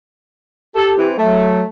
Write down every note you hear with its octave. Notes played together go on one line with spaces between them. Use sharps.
G4 A4
E3 C4
F#3 A3